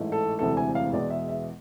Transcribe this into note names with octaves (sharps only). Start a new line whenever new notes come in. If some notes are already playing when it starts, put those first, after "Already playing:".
Already playing: A1 G#2 E3 A3
A4
E1 D2 C3 E3 A3 A4
G#5
F5
E2 B2 G#3 B3 D5
E5
E5